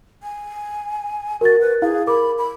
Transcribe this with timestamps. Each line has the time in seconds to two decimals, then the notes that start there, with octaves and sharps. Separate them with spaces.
0.23 G#5
1.41 F#4 A#4 A6
1.60 B4
1.82 E4 G#4 F5
2.07 A#4 B5 D6
2.38 B5